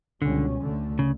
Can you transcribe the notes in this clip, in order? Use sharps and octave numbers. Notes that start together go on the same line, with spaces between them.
C#2 B2 D3 G3 C#4
D2 D3 A3
C#3